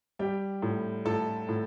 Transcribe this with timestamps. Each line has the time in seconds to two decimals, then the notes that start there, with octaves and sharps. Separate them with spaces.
0.19 G3 G4 G5
0.62 A2
1.05 A2 A4 A5
1.49 A2